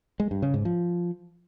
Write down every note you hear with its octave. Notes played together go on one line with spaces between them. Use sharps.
G#3
G2
C#3
G#2
F3